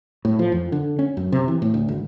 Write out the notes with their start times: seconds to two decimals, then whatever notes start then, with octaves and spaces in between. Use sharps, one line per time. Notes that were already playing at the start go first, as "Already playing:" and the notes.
0.25 A2
0.39 F3
0.52 F2
0.72 D3
0.99 C#4
1.17 F#2
1.32 C3
1.48 E3
1.62 A2
1.74 D2
1.88 G#1